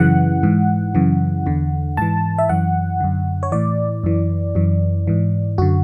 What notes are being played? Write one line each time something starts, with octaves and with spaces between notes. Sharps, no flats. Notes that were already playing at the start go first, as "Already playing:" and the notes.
Already playing: F#2 C#3 E3 F#5
G#2 E3
F#2 C#3 E3
E2 D3
G#2 E3 A5
E5
F#2 E3 F#5
F#2 D3
C#5
A2 E3 D5
F#2 E3
F#2 E3
G#2 E3
F#2 D3 F#4